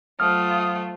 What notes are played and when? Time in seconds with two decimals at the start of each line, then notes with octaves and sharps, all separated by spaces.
0.20 F#3 A3 F4 C5 D#6 F6